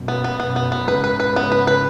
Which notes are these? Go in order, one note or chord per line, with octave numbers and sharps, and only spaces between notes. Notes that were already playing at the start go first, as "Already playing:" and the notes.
Already playing: F#2 B2
B3
B3
F#2 B2 B3
B3
B3
G#2 C#3 B4
B4
B4
B3
B4
B4